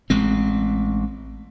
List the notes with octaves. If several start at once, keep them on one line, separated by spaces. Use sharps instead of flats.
A1 G#3 C4